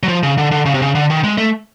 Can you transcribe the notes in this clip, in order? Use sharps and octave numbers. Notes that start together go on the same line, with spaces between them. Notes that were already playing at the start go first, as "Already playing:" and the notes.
F#3
F3
C#3
D3
D3
C#3
C3
C#3
D3
D#3
G#3
A3